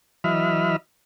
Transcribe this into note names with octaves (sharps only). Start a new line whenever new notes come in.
E3 F#3 D#5 E5 B5 F6